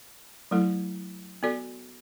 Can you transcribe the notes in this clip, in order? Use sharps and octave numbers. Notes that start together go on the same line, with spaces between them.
F#3 A3 E4 A4
B3 F#4 A4 D5